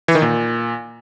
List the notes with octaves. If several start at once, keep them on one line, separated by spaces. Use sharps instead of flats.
E3
D#3
A#2